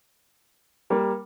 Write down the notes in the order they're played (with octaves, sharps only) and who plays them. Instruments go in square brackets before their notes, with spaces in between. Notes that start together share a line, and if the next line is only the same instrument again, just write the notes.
[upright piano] G3 A#3